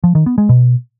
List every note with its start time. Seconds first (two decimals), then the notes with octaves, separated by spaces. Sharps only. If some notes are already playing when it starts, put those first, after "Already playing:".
0.04 F3
0.15 D#3
0.26 B3
0.38 G#3
0.49 B2